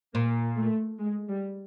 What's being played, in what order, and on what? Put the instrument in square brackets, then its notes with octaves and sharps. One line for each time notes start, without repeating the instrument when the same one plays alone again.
[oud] A#2 [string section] A#3
[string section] A3
G#3
G3